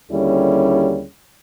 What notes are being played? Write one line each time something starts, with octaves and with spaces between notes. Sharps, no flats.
D#2 D3 G3 C#4 E4 G#4